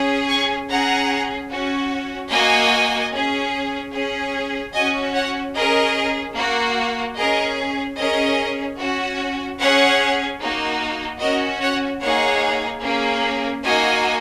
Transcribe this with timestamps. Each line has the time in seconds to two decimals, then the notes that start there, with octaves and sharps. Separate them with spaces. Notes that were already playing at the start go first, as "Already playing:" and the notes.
Already playing: C#4 G#4
0.29 G#5 C#6
0.69 C#4 G#4 F#5 A#5
1.50 C#4 F#4
2.31 A#3 F#4 D#5 G#5
3.11 C#4 G#4
3.93 C#4 G#4
4.73 C#4 F#4 D#5 G#5
5.14 C#5 F#5
5.54 C#4 G#4 A#4 D#5
6.35 A#3 F#4
7.16 C#4 G#4 A#4 D#5
7.96 C#4 G#4 A#4 D#5
8.78 C#4 F#4
9.59 C#4 G#4 C#5 F#5
10.40 A#3 D#4 F#4
11.20 C#4 F#4 A#4 D#5
11.61 C#5 F#5
12.01 A#3 D#4 G#4 C#5 F#5
12.82 A#3 C#4 G#4
13.63 A#3 D#4 F#4 D#5 G#5